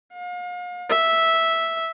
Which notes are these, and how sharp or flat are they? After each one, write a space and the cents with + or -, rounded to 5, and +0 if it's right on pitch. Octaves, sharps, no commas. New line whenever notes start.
F5 +40
E5 -5